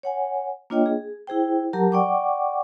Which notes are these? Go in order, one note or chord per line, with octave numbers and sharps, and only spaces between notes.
C#5 F#5 G#5
A#3 D4 F4 C#5 D#5 G5
G#4
E4 G#4 C5 G5
F#3 G4 A#4 F#5 A5 A#5
D5 F#5 G5 C#6 D6